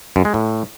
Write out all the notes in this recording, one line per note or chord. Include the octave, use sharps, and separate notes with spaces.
F#2
G#3
A2